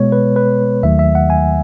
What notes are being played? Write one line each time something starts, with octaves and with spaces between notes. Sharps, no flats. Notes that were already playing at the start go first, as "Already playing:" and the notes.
Already playing: B2 G#3 B3 C#5
B4
B4
D#2 D#3 F#3 A3 E5
E5
F#5
G#5